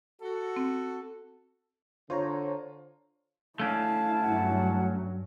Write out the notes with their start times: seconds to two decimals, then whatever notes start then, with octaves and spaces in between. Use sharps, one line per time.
0.21 F#4 A4
0.56 C4
2.10 D3 F4 C5 C#5 A#5
3.60 A3 C#4 D4 E4 F5 A5
4.22 G2 F#3 F#5